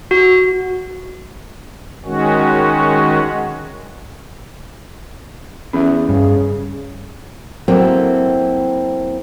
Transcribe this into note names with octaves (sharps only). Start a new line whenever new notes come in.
F#4
D#3 G#3 C#4 F#4
E2 C#4 E5
G2 C#3
F#3 A#3 C4 E4 A4